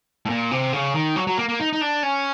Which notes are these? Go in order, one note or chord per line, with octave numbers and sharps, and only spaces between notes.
A2
A#2
C3
C#3
D#3
F#3
F#3
A#3
A#3
D#4
D#4
D4
C#4